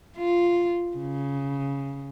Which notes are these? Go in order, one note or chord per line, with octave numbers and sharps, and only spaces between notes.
F4
C#3